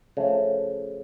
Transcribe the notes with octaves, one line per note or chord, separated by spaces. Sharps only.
C#3 F3 A3